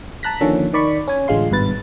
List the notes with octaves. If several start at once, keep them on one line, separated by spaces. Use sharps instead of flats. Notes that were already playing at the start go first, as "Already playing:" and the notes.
A5 A#5 F#6 A#6 B6
D3 D#3 F3 A#3 C#4 A4
D#3 D5 B5 C#6
C#4 G#5
A1 D3 G#3 F4 C6
G#1 G2 B2 B4 A6